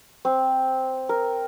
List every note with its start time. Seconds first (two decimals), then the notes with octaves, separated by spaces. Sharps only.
0.25 C4
1.09 A#4